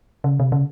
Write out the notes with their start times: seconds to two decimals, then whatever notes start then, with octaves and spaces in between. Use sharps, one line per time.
0.24 C#3
0.40 C3
0.52 C#3